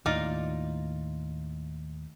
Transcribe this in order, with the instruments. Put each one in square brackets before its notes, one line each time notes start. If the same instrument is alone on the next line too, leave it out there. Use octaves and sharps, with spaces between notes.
[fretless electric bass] D#2 A2 [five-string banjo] D#4 F4 D5